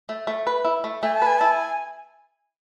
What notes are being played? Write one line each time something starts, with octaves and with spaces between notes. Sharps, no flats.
A3
A3
B4
E4
A3
A3 G#5
A5
B4 G#5
E4 A5
G#5